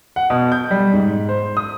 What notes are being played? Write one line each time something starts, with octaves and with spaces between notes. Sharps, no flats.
F#5
B2
G6
G3
G#2
C5
D#6